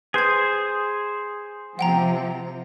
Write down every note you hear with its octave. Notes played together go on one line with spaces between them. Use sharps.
G#4 B4 C5 G#6
C3 F3 F#5 G5 A#5